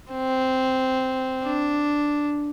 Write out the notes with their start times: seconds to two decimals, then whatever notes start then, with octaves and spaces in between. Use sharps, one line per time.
0.12 C4
1.43 D4